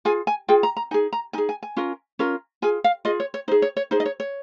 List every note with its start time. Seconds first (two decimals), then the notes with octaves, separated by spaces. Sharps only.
0.05 F4 G#4 G#5
0.27 G#5
0.48 F4 G#4 G5
0.63 A#5
0.77 A#5
0.91 D#4 G#5
0.94 G#4
1.13 A#5
1.33 D#4 G#4 G#5
1.49 G#5
1.63 G#5
1.76 C#4 F4 A#4
2.19 C#4 F4 A#4
2.62 F4 G#4 G#5
2.84 F5
3.05 F4 G#4 D#5
3.20 C#5
3.34 C#5
3.48 D#4 C5
3.51 G#4
3.62 C#5
3.77 C#5
3.91 D#4 G#4 C5
4.00 D#5
4.06 C#5
4.20 C#5